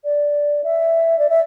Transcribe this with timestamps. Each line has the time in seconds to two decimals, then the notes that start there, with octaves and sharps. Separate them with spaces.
0.04 D5
0.63 E5
1.18 D5
1.29 E5